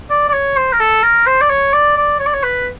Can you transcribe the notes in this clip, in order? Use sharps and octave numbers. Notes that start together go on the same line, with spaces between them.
D5
D5
C#5
C5
A#4
A4
A#4
C5
D5
C#5
D5
D5
C#5
D5
C#5
B4